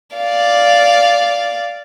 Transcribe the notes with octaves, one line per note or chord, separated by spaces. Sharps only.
D5 F5